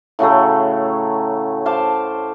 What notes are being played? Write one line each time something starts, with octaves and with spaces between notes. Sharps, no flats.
A2 C#3 F#3 A3
C5 F5 A5 D6